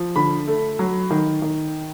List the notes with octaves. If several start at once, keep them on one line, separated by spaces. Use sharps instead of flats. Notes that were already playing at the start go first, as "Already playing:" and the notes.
Already playing: F3
D3 B5
A3
F#3
D#3
D#3